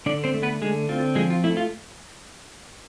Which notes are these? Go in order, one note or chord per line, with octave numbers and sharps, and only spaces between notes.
D3 D4 D5
C4 C5
A3
B3 B4
D3 G#3 G#4
C4 F4
F3 G#3 G#4
F4
A3 E4
F4